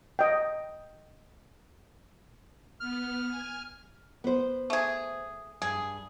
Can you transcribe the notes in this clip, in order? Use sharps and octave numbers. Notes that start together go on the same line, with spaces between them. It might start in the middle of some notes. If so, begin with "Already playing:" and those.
D#5 G5
B3 F6
G#5
B3 C5
A3 G#4
G2 G#4